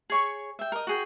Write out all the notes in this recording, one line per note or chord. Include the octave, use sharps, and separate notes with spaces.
G#4 C#5 C#6
E5 G5
A#4 D#5
F#4 G#4 G5